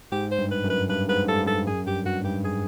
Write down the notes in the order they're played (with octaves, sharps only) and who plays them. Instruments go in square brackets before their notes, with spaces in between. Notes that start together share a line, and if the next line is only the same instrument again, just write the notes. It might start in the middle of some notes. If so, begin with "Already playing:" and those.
[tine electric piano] G#2 [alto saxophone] G4
[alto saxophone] C5
[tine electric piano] G2
[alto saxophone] B4
[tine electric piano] F#2
[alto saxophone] B4
[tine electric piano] G2 [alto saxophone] B4
[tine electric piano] G#2 [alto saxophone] B4
[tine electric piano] G2 [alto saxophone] A4
[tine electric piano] G2 [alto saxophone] A4
[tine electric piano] F#2 [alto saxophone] G#4
[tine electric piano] G2 [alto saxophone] G4
[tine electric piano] G2 [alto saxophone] F#4
[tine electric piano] G#2
[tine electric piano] G2 [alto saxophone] G4
[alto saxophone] G#4